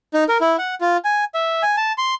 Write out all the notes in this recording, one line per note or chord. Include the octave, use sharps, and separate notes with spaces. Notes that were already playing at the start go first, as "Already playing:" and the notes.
D#4
A#4
E4
F#5
F4
G#5
E5
G#5
A5
C6